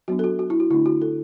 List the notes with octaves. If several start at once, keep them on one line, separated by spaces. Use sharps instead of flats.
F#3 B3 D4 F#4
A4
F#4
F#4
E4
F#4
D3 A3 D4 E4
F#4
A4